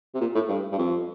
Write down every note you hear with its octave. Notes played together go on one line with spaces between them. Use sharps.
C3
A#2
A2
G2
G2
F2